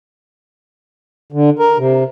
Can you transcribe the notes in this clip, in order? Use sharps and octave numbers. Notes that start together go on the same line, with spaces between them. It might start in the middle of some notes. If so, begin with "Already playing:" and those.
D3
A#4
C3